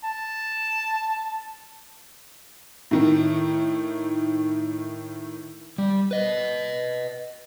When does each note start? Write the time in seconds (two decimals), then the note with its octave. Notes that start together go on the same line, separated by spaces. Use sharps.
0.04 A5
2.91 A2 D#3
5.78 G3
6.11 B4 D#5